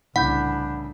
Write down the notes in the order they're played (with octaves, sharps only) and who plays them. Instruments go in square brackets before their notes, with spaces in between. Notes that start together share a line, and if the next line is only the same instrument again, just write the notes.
[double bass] C2 D4 [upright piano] A2 C#3 E3 [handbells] F#5 [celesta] B5 G6